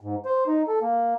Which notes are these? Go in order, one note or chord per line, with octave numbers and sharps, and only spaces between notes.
G#2
C5
D#4
A4
A#3